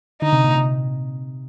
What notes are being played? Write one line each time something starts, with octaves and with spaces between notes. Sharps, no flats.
D3 D#4
C3
A#2
C3